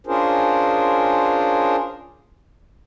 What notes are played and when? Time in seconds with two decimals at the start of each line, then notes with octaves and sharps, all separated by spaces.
0.07 C#4 D4 F4 G#4 A#4 C5